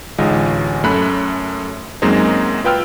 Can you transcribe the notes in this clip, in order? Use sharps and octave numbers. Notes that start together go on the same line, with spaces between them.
A1 D2 G#3 D#4 F4 G#5
F#2 A3 C#4 B5 F#6
F#2 F#3 G#3 A#3 C4 D#4
F4 B4 G5 E6 F6